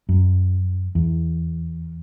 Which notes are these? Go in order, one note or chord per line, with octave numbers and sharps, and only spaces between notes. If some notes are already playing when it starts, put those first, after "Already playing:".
F#2
E2